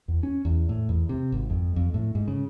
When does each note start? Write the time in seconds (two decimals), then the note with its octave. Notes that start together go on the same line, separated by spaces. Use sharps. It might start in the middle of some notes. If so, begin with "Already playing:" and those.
0.08 E2
0.23 C#4
0.45 E2
0.69 A2
0.89 E2
1.09 C3
1.32 G#1
1.50 F2
1.76 F2
1.94 A2
2.15 G#2
2.28 C#3